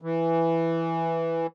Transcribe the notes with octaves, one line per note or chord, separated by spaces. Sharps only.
E3